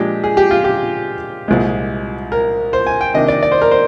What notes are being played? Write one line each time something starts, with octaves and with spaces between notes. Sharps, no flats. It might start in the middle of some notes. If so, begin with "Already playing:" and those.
Already playing: A#2 F3 G#3 D4 G4
G#4
G4
F4
G4
C2 A#2 G#3
A#4
C5
G#5
G5
C3 D#3 A#3 D4 D#5
D5
D5
C5
A#4
C5